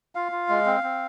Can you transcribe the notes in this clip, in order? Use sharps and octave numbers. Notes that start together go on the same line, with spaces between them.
F4 F5
F4
G#3
C4
C4